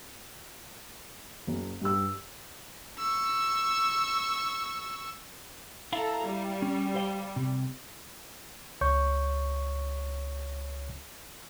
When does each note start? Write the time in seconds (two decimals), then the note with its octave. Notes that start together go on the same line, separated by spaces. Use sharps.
1.47 F#1
1.82 G2 G4 E6
2.98 C#6 E6
5.93 E4 A4 F5 A#5
6.26 G3
6.62 C#4
6.95 C5 F5 G5
7.36 C3
8.81 C#2 C#5 C#6 G6